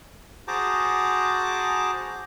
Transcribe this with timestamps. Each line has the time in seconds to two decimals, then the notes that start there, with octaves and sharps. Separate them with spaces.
0.48 F#4 G#4 C5 A5 A#5 D6